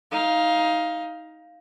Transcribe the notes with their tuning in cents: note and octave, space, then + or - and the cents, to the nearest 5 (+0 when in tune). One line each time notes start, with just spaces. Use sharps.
D#4 +20 F5 +0